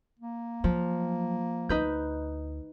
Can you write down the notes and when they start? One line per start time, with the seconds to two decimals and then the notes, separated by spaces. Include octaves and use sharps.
0.19 A#3
0.64 F3 F#3
1.69 D2 D#4 B4 G6